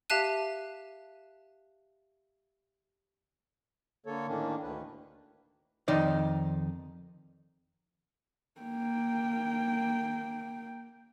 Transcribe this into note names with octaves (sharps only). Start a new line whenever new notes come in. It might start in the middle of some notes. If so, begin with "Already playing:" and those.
G4 E5 F5 A5 F#6 D#7
D3 A#3 A4 C#5
A2 D#3 A#3 C#4 D4
D2 D#3 B4
F2 D#3 D#4 D5 D#5
A#3 G5